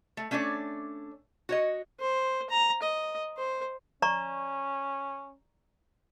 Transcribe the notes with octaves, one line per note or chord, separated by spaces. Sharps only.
A3
A3 C#4 D4 C#5 D5
F#4 C#5 D#5
C5
A#5
D#5
C5
C#4 D5 A#5 C#6